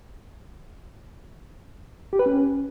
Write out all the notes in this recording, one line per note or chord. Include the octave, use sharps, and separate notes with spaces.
G4
B4
C#4